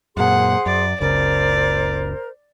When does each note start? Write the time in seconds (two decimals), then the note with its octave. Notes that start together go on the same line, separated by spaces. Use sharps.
0.17 F#2 A#2 G#4 C5 F#5 C6
0.66 F#2 D5
1.00 F#1 C#2 C#3 A#4 C5 D5